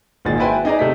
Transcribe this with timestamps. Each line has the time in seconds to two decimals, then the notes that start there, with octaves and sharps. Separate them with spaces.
0.25 G#1 A#2 D#3 G#4 A6
0.39 E4 F#4 B4 C5 G5 G#5
0.65 D#4 E4 G#4 D5 D#5 A#5
0.79 C3 A3 B6